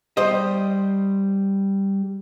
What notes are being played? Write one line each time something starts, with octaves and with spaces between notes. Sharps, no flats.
G3 C5 D#5